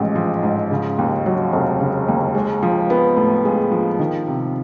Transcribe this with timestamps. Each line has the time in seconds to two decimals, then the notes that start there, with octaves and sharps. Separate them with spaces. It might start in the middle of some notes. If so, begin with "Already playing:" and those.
Already playing: A1 G#2 F3 G#3
0.15 F3
0.43 G#2
0.71 C#3
0.98 D#2
1.26 F#3
1.53 F1
1.80 C#3
2.08 D#2
2.35 G#3
2.63 F3
2.90 B3
3.17 A2
3.45 G#3
3.72 F3
3.99 D#3
4.27 C3